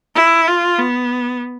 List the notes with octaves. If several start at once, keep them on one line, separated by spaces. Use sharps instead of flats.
E4
F4
B3